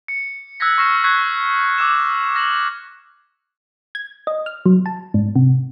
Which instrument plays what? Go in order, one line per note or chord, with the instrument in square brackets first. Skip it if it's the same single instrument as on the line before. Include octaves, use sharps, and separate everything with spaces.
[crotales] C#7
E6 F#6 G#6 A#6 B6
C#6 F6 A#6 C7 E7
C#6 F6 F#6 G#6 B6 C7
D6 E6 E7
F6 A#6 E7 F#7
[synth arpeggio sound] G#6
D#5
F6
F#3
A5
G#2
C3